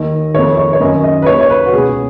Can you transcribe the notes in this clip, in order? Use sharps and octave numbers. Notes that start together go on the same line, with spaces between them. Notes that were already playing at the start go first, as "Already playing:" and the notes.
Already playing: D#2 D#3 D#5
F2 D#3 C#5
C#5
C#5
F#2 D#3 D#5
D#5
B4
D#2 C#3 C#5
C#5
B4
F#4
C#2 B2 G#4